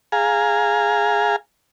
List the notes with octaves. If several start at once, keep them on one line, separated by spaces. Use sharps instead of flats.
G#4 F5 G#5 A#5